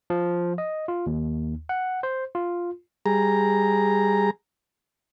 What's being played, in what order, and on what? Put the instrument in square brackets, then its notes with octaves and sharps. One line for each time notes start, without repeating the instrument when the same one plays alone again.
[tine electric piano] F3
D#5
F4
D#2
F#5
C5
F4
[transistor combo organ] G3 G#4 A#5